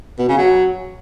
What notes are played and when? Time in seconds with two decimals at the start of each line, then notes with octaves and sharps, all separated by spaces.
0.19 B2
0.28 C#3
0.38 F#3